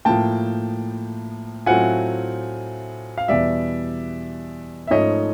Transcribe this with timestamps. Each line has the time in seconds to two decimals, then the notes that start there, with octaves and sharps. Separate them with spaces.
0.05 A2 F3 A#3 G5 A5
1.66 A2 F#3 A3 C4 F4 F#5 G#5
3.18 F5
3.28 E2 B2 G3 D5 E5
4.87 E5
4.91 G#2 F3 A3 C#4 C#5 D#5